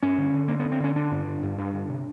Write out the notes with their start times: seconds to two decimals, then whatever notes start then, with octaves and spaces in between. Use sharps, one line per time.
0.02 G2 C#4
0.18 D3
0.33 D3
0.48 D3 A#3
0.59 B3
0.65 D3
0.72 C4
0.80 D3 C#4
0.95 D3 D4
1.11 G2
1.27 D3
1.43 G2
1.58 G2
1.74 D3
1.89 C3